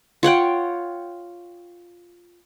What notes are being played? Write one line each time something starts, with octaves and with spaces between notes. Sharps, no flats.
F4 C#5 F#5 G5